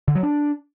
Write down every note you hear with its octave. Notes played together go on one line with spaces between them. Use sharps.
D3
F#3
D4